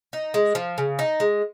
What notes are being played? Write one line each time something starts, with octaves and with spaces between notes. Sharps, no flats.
D#4
G#3
F3
C#3
D#4
G#3